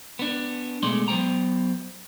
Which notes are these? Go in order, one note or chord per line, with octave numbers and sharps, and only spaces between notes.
B3 D4
B2 G#3 A3 D5 C6
F#3 B3 C5 G5 A#5